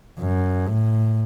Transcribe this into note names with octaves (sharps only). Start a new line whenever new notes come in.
F#2
A2